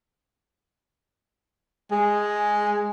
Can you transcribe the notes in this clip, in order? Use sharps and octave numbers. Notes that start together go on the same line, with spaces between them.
G#3